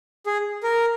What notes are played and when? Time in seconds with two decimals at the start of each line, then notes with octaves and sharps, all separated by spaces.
0.26 G#4
0.63 A#4